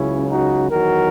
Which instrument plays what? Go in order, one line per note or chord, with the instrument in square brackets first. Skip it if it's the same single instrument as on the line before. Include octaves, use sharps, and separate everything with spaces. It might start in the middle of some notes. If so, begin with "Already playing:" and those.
Already playing: [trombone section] C#2 C#3 F#3 C#4 E4
D#4 F#4
E2 D#3 F#3 F#4 A#4